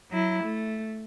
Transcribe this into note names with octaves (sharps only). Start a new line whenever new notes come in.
F#3 E4
A3